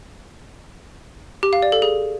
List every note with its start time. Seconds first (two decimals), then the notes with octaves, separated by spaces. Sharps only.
1.43 G4
1.53 F5
1.62 D5
1.72 A4
1.82 G#4